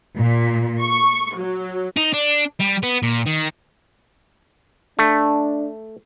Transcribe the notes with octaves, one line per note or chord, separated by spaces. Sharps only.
A#2
C#6
F#3
D#4
D4
G3
B3
A#2
D#3
A3 D4